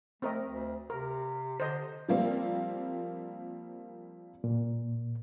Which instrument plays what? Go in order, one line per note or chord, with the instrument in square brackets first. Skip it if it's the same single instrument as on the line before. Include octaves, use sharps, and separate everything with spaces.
[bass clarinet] A3 [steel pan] C4 A#4 D#5
[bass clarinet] D2
[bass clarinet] C3 [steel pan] A#4
[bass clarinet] D3 [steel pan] C5 D#5
[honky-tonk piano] F3 G3 A#3 C4
[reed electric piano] A#2